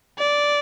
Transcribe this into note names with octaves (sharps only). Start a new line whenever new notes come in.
D5